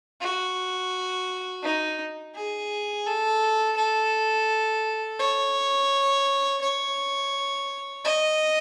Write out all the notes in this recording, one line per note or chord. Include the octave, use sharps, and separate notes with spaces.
F#4
D#4
G#4
A4
A4
C#5
C#5
D#5